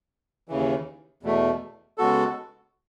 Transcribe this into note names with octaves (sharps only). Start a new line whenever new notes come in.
D#2 C#3 E3
E2 B2 A3
C#3 G#3 B3 F#4 A4